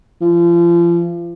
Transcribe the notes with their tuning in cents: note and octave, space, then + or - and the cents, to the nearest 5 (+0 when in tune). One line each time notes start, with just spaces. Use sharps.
F3 -35